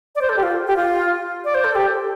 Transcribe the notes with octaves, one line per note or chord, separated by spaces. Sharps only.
D5
C5
A4
G4
F4
G4
F4
D5
C5
A4
G4